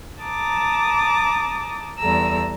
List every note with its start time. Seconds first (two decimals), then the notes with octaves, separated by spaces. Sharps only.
0.21 A5 A#5 D6 D#6
1.98 E2 G3 A4 A#5 E6